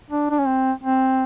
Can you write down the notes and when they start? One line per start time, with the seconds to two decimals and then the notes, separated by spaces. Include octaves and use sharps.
0.11 D4
0.30 D4
0.39 C#4
0.47 C4
0.83 C4